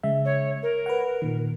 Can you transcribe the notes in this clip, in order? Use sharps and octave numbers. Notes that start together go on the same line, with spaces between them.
C#3 G#3 E5
C#5
A#4
B4 F#5
A#2 D#3